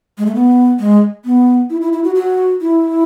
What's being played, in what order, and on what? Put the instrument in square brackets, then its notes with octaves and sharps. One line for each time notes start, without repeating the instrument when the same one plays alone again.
[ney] G#3
A3
B3
G#3
B3
E4
E4
E4
F#4
F#4
E4